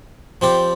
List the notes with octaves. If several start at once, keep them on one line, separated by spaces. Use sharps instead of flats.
F3 C4 G4 D5